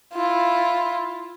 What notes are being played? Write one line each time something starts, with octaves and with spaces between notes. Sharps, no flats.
E4 F4